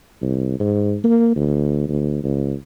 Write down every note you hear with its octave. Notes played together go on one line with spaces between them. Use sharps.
C2
G#2
A#3
D2
D2
C#2